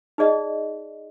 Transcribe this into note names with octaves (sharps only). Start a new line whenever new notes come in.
D#4 G#4 D5 D#5